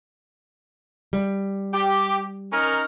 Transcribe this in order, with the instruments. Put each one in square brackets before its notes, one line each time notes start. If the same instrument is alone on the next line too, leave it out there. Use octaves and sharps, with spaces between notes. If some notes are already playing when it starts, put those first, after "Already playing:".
[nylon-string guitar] G3
[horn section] G4
C#4 D#4 A#4